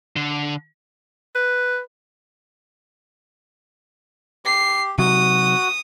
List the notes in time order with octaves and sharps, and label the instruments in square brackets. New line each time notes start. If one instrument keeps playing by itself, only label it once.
[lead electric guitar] D3
[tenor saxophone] B4
[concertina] G4 [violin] C7
[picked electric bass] C3 F#3 [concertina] F#4 [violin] D#6